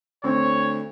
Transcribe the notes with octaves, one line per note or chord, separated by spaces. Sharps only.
D2 C4 C#5